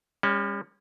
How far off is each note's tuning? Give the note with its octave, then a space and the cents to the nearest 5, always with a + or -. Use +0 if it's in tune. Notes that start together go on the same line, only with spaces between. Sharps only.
G3 +45 C#4 +0